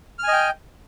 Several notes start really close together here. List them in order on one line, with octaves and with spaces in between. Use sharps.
F6 G#5 D#5 G5